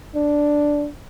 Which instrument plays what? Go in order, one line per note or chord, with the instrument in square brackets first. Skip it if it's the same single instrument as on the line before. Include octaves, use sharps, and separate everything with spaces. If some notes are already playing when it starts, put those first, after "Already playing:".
[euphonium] D4